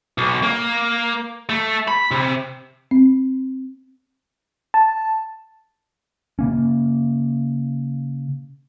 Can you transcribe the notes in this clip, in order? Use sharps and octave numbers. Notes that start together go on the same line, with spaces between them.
B1
A#3
A3
B5
C3
C4
A5
C#3 A#3 C#4